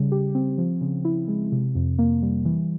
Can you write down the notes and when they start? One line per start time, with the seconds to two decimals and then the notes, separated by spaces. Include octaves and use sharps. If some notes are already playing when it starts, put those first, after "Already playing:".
Already playing: C#3 G3
0.12 G4
0.35 C4
0.58 F3
0.81 C#3
1.05 E4
1.28 G#3
1.52 C3
1.75 F2
1.99 A#3
2.22 G3
2.45 E3